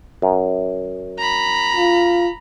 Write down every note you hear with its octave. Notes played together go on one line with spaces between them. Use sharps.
F#2
A#5 B5
F4